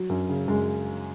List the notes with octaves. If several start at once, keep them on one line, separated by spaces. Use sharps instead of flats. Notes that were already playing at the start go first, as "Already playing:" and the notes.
Already playing: F#3
F#2
C#3
F#2 G#3